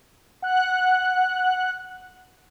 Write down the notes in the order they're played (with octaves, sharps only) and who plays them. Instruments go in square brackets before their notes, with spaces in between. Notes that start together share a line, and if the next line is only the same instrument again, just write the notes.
[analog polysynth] F#5 F#6